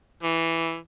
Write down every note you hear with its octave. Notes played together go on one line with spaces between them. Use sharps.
E3